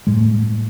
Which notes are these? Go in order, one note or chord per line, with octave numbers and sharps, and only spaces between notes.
A2 G#3
A3